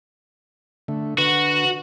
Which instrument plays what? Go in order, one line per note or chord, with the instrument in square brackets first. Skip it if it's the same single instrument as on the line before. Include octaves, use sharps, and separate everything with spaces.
[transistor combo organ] D3 A3
[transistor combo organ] D3 B4 [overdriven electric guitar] F#4